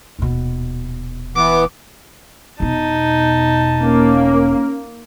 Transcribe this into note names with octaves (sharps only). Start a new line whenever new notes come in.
D#1 B2
E3 B3 D6
E1 B2 D#4 A5
A#3 C#4